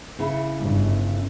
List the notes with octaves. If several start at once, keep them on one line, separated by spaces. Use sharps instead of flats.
C#3 C#4 E4
G1